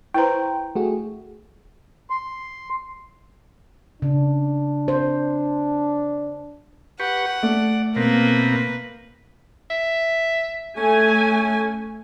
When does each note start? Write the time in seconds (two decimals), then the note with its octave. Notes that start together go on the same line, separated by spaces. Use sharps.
0.14 E4 B4 C5 G5 A#5
0.75 A3 F#4 G#4
2.10 C6
4.02 C#3 D4
4.88 C5
7.00 G4 B4 F#5 C#6
7.43 A3 D5
7.96 B2 A#3 C4 A#4 B4 A#5
9.70 E5
10.77 A3 C#4 G#5